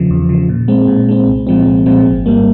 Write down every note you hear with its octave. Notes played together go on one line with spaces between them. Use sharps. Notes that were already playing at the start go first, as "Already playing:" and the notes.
Already playing: E2 C#3 F3
E2
C#3 F3
A#2
G#3 C4
A#2
G#3 C4
C2
A#2 F3 G#3 C4
C2
A#2 F3 G#3 C4
G#1
G#2 G3 A#3